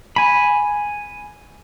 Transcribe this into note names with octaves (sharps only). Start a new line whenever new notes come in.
G#5 B5